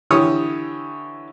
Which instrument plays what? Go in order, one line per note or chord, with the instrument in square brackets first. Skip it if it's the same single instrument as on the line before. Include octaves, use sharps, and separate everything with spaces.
[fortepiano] D3 E3 G4 C#5 D#6